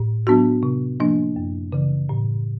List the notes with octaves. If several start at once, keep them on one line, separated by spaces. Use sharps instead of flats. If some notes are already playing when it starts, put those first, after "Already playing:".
Already playing: A2
F#3 B3 D4 F#4
C3
F3 A#3 D4
F#2
C#3 E3
A2